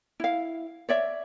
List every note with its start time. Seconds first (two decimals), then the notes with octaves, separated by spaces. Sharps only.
0.20 E4 F5
0.89 C#5 D5 E5